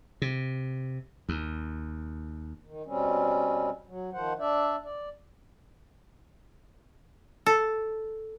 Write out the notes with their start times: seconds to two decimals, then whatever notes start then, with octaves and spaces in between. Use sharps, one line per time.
0.22 C3
1.29 D#2
2.65 D#3
2.86 B2 G3 C4 C#4
3.87 F#3
4.13 D#3 F3 C5 F#5
4.39 D4 D5 E5
4.84 D5
7.46 A4